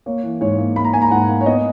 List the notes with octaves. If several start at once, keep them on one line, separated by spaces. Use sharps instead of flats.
A#3 C#5
E3
G#2 C#5
A#3
A#3 B5
A#5
A#3 G#5
A#5
G#2 F#5
A#3
C#5
B3 D#5